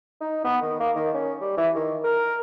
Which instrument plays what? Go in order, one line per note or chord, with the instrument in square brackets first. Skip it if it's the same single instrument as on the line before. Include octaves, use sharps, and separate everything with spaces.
[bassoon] D#4
B3
D#3
A#3
D#3
C#4
G3
E3
D#3
A#4